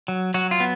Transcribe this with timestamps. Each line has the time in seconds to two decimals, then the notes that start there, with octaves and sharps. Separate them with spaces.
0.08 F#3
0.34 F#3 F#4
0.51 F4
0.60 B3